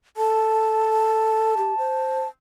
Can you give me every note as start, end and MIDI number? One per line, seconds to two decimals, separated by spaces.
0.17 1.54 69
0.17 2.28 81
1.57 1.76 67
1.78 2.21 72